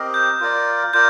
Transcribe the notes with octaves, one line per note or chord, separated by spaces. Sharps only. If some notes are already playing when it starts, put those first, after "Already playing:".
Already playing: C4 G4 A#4 D#5
G6
F4 A#4 D5
F4 A#4 D5 G6